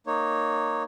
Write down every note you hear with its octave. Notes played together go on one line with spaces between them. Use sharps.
A#3 D#4 C#5